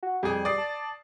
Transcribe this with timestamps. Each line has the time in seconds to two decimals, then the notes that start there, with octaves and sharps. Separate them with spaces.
0.03 F#4
0.23 F2 G3 G#4
0.45 D5 D#6 C7
0.58 A5